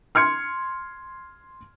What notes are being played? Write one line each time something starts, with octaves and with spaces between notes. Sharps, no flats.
C6 F6 G#6 C#7